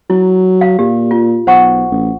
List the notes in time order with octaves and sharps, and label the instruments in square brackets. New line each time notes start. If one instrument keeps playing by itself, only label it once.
[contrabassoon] F#3 [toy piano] E4
[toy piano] F5
[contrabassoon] A#2 [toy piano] G4
[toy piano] F4
[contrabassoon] B1 [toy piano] C5 F#5 C#6
[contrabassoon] A1